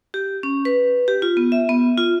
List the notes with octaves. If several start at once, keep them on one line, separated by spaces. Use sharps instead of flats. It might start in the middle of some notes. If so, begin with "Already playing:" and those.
G4
C#4
B4
G4
F4
B3
E5
B3
F4